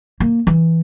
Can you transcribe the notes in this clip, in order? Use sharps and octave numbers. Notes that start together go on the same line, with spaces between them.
A#3
E3